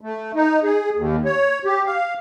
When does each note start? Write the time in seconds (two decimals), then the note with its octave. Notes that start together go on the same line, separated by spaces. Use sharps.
0.01 A3
0.35 D#4
0.64 G#4
0.96 D#2
1.25 C#5
1.65 G4
1.86 F5